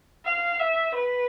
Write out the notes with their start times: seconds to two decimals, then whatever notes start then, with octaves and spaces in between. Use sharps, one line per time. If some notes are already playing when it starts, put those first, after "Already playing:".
0.25 F5
0.59 E5
0.95 B4